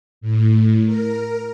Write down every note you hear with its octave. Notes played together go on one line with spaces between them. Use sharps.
A2
A#4